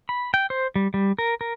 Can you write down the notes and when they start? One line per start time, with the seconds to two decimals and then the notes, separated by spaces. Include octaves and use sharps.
0.09 B5
0.34 G5
0.50 C5
0.76 G3
0.94 G3
1.18 A#4
1.41 A#4